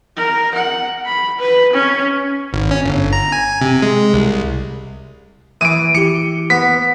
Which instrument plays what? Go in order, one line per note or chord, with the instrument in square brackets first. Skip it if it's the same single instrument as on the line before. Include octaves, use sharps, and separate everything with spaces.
[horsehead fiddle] A#4
F#5
B5
B4
C#4
[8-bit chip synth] G#1
C#4
G1
A#5
G#5
C3
G#3
C2
[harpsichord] E3 [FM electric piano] D#6 [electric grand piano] D7 D#7
[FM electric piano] E3 E4 G4 [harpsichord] D6 [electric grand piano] C#7
[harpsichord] B3 [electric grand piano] B6